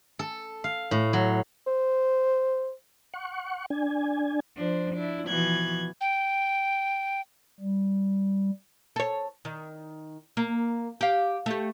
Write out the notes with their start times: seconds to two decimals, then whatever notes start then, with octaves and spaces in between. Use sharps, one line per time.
0.19 A4
0.64 F5
0.91 A2
1.13 F#3
1.67 C5
3.14 F#5 C#6
3.70 D4 G#5
4.57 F3 D4 C5
4.94 D4 E4
5.28 B2 E3 F3 F#6 G#6
6.01 G5
7.60 G3
8.96 A4 C#5
9.45 D#3
10.37 A#3
11.01 G4 F5
11.46 A3 G4